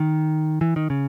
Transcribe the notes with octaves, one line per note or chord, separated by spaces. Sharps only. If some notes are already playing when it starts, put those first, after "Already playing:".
Already playing: D#3
E3
D#3
C#3